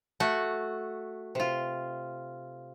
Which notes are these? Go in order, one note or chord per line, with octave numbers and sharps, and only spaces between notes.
A3 F#4
C3 F4